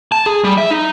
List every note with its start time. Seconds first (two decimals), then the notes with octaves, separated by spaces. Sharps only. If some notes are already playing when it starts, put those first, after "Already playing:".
0.12 A5
0.26 G#4
0.44 G3
0.58 E5
0.71 D#4